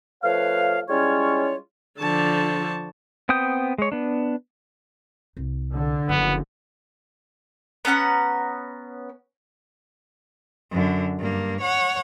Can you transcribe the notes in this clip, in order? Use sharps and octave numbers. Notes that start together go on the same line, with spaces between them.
F3 A3 B4 C#5 F5
G3 G#3 C#4 E4 F4 C#5
D3 F3 A5 C#6
B3 C4 G5 D#6 G6
G#3 C#5
B3 D4
C2
D3
F#1 F3 B3
B3 C#4 F#5 A#5
F#2 D3
G2 A#3
C#5 F#5